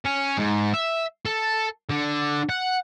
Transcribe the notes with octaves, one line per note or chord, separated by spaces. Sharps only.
C#4
G#2
E5
A4
D3
F#5